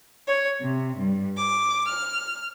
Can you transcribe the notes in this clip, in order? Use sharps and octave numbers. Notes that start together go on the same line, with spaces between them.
C#5
C3
G2
D6
F6